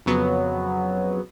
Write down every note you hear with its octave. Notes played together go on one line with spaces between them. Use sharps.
F2 C#3 F#3 B3